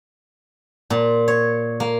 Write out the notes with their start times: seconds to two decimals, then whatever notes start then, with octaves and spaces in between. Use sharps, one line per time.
0.90 A#2
1.28 C#5
1.80 A#3